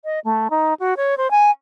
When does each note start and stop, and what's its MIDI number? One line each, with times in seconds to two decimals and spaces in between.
0.05 0.19 75
0.25 0.48 57
0.50 0.74 63
0.80 0.94 66
0.97 1.15 73
1.18 1.30 72
1.31 1.51 80